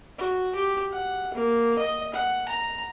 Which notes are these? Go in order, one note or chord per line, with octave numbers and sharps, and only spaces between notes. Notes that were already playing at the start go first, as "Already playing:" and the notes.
F#4
G4
F#5
A#3
D#5
F#5
A#5